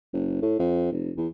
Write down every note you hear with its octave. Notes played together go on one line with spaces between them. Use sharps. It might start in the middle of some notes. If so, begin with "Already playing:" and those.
F#1
A2
F2
F1
E2